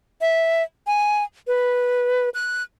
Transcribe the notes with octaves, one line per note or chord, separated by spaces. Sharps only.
E5
G#5
B4
F#6